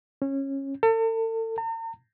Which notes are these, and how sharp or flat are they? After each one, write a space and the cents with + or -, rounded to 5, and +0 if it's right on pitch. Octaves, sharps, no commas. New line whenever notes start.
C#4 -20
A4 +40
A#5 -45